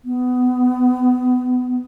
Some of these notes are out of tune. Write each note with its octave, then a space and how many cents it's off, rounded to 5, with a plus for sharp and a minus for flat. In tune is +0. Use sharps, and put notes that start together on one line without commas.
B3 +20